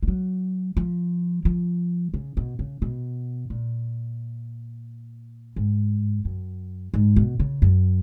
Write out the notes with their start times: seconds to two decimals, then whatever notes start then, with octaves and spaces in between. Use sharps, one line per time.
0.03 G#3
0.08 F#3
0.77 F3
1.45 F3
2.14 C#3
2.37 B2
2.59 C#3
2.82 B2
3.50 A#2
5.56 G#2
6.25 F#2
6.94 G#2
7.16 B2
7.40 C#3
7.62 F#2